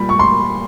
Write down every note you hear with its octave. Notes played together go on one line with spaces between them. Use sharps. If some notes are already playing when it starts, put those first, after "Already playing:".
Already playing: A#2 G3 B5
C#6
C6